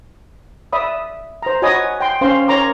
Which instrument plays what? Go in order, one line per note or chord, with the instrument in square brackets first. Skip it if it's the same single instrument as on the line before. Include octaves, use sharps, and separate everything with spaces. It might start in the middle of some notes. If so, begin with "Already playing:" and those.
[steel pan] D5 E5 B5 D#6
C5 A#5
F#4 C#5 D#5 G#5 B5 D#6
G5 C6
C#4 C5 F5 C6
A#4 C#5 G#5 A#5 C6 D6